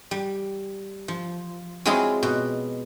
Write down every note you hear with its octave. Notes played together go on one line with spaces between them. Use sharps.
G3
F3
F#3 G#3 C4 E4 F4 G#4
B2